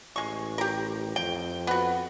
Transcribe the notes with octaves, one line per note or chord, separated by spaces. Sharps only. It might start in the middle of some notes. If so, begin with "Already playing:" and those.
A1 G#3 C#6
G4 A#4
F2 G5
B3 F#4